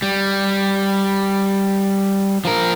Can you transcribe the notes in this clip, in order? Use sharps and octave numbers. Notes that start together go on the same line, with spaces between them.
G3
F3 A#4